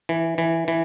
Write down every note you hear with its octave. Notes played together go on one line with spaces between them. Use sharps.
E3
E3
E3